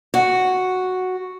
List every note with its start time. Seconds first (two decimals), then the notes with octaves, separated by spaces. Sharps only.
0.14 F#4